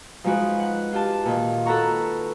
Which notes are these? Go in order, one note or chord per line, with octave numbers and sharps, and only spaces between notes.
F3 G#3 D#4 F#4 B4
F#5
F4 G4 A5
A#2 D#3
F#4 A4 B4 F#5 A#5 C#6